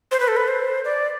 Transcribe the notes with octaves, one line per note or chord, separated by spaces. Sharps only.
C5
B4
A4
B4
C5
D5